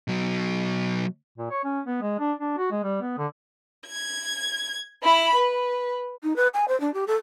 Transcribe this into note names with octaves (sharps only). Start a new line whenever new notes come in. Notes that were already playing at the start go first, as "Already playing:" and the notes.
B2 F#3
A#2
C#5
C#4
B3
G#3
D4
D4
F#4
G#3
G3
B3
D3
G#6
E4 B5
B4
D#4
B4
G#5
C5
D4
G4
A4